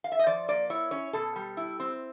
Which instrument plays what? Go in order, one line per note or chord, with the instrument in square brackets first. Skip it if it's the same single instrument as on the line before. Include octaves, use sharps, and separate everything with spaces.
[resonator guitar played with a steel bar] F5
E5
D#5
F3 D5
A#3 D5
E4 C#5
C#4 C#5
B2 A4
G3
E4
C4